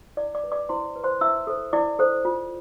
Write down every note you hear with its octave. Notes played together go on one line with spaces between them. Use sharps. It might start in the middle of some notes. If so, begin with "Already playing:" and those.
E4 D5 D6
D5 D6
B4
D5 D6
E4 C5 C6
B4
C5 C6
E4 E5 E6
A4 C5
E4 D5 D6
A4 C5
F4